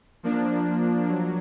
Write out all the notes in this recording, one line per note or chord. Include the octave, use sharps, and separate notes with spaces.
F3 A#3 D4
F#3